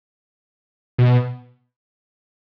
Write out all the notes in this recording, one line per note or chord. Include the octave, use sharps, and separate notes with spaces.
B2